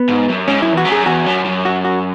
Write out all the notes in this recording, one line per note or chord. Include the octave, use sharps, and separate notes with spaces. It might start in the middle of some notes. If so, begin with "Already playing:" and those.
Already playing: B3
G#2
F#2
G#2 C#4
F#2 E4
E2 F#4
F#2
G#4
E2 F#4
F#2
F#2
F#4
F#4